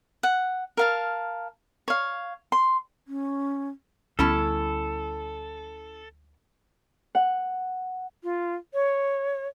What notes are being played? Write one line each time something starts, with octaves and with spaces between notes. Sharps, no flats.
F#5
A#4 F5 A5
C#5 F5
C6
C#4
D2 G3 B3 C#4 E4 A4 A5
F#5
F4
C#5